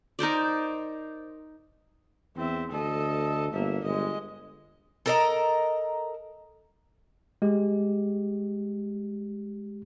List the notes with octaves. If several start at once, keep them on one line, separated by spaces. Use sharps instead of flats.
D#4 A#4 C5 D5
E2 C4 E5
D2 A4 D#5
G1 A#3 E5
G1 G#3 D#5
A4 A#4 D#5
G#3 G4